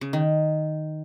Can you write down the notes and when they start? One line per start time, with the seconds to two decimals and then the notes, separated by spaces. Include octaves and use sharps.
0.01 C#3
0.13 D#3